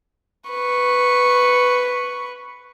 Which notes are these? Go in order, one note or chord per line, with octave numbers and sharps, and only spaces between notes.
B4 C#6